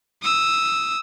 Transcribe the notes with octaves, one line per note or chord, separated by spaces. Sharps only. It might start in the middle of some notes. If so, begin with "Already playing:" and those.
D#6 E6